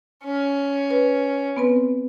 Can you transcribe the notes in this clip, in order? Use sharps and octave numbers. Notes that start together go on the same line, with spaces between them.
C#4
B4
B3 C4 B4